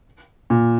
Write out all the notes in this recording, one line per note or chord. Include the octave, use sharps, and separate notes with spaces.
A#2